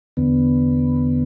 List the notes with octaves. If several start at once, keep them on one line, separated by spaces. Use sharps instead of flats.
E2 D3 B3